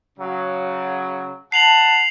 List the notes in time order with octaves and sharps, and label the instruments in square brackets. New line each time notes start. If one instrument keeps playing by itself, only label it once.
[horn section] C#3 F#3
[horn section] F#5 A5 [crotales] C7 F7 F#7